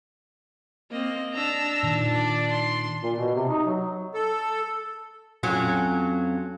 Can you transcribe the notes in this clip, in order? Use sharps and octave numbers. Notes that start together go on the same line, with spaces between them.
A#3 C4 D#5
D4 A5 A#5 E6
A#2 D#3
D5
C6
A#2
B2
C3
D#4
F#3
A4
F2 F#3 C#4